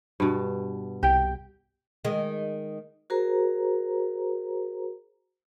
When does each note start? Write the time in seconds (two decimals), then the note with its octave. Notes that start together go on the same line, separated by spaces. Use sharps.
0.20 G2 B2
1.03 C2 G4 G5
2.05 D#3 G#3
3.10 F#4 G#4 A#4 C5 A#5